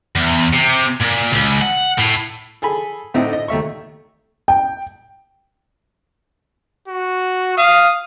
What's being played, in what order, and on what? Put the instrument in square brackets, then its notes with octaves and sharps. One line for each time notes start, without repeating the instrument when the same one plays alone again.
[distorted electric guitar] E2
C3
A#2
C#2
F#5
A2
[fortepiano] G#4 A4 G#5 B5
A2 D3 C4 D#4 E4
D#5
D#2 A3 E5 C#6
[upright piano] G5
[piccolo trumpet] F#4
[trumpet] F5 [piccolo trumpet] D#6